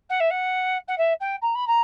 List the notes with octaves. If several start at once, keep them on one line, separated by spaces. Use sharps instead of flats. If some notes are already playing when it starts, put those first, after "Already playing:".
F#5
E5
F#5
F#5
E5
G5
A#5
B5
A#5